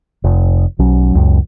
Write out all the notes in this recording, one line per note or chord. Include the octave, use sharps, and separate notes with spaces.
F1
B1 F#3 C#4
C#2 F#2